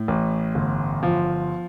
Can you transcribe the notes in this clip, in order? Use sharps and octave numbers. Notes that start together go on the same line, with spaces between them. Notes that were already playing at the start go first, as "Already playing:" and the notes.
Already playing: A2
A1
G1
F3